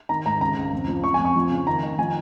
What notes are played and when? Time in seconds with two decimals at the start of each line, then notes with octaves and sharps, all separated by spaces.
0.09 D#3 A#5
0.26 G#2 A#5
0.40 C#2 A#5
0.57 C#2
0.73 F2
0.88 F3
1.03 F2 C#6
1.14 G#5
1.19 F2
1.25 C#6
1.36 F3
1.51 C#3
1.67 D#3 A#5
1.83 D#3
1.99 F3 G#5